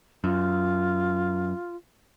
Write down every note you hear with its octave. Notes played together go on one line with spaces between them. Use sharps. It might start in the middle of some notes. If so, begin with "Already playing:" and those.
F#2 F4